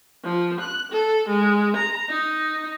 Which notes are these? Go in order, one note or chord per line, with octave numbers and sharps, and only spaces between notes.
F3
F#6
A4
G#3
A#5
D#4